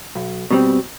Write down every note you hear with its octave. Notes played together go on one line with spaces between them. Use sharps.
B1
B2 G3 C4